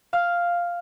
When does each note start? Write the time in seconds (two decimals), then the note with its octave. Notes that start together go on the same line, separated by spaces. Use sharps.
0.13 F5 F6